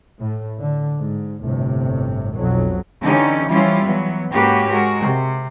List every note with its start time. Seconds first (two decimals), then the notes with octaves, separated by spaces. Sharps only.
0.20 A2
0.58 D3
0.97 G#2
1.41 G1 A2 C3
2.35 B1 F2 F#3
3.03 D3 E3 C#4 D#4 G4
3.48 E3 F3 G3 C#4 E4 F4
3.84 E3 F#3 B3
4.32 G#2 A#3 C#4 F#4 G4 B4
4.70 G#3 F#4 A#4
5.01 C3